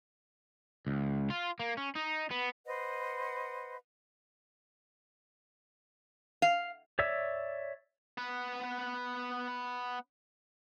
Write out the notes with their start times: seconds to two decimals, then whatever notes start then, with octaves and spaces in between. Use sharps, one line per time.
0.87 C#2
1.30 F4
1.59 A#3
1.77 C#4
1.95 D#4
2.31 B3
2.66 B4 C5 D#5 F#5
6.42 F5
6.99 C#5 D5 E5 E6
8.18 B3 B4